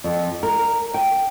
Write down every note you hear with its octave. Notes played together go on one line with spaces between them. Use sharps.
F2
A#4
G5